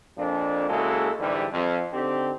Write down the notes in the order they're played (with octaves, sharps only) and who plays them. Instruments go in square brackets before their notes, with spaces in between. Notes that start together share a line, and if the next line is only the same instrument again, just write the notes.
[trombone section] F2 A#2 D4
C#3 G#3 A#3 E4 F#4 A4
G#2 D3 E3 G3
F2
D3 C4 D#4 G4